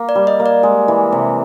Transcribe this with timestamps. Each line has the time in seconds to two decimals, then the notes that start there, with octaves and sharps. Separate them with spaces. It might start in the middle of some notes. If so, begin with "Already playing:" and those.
Already playing: A#3
0.09 D5
0.15 G3
0.27 D#5
0.40 A#3
0.46 D5
0.63 G#3
0.88 E3
1.12 C3